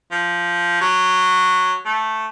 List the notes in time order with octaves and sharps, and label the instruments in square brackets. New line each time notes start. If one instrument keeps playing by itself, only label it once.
[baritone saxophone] F3
F#3
A3